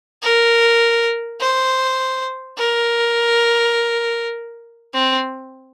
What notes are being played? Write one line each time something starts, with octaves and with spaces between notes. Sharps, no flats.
A#4
C5
A#4
C4